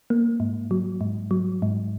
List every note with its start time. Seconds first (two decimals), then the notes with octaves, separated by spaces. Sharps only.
0.10 A#3
0.40 G#2
0.71 F#3
1.01 G#2
1.31 F#3
1.62 G#2